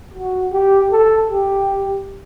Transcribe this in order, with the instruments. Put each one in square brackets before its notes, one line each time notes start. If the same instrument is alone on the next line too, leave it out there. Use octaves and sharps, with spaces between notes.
[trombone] F#4
G4
A4
G4